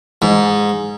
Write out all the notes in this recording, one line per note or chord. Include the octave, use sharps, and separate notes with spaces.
G#2